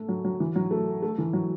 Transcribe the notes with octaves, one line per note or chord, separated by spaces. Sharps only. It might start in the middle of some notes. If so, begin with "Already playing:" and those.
Already playing: A3
F#3
F#3
E3
F#3
A3
A3
E3
F#3